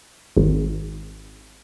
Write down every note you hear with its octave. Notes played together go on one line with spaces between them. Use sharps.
G#1